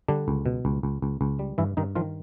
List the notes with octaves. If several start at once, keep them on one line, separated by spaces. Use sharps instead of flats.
D3 G3 D4
C#2
B2
C#2
C#2
C#2
C#2
G3
G2 E3 E4
G2 D#3 D#4
D#3 F3 F4